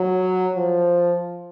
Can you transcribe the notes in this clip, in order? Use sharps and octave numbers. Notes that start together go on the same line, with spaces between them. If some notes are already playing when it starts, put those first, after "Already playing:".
Already playing: F#3
F3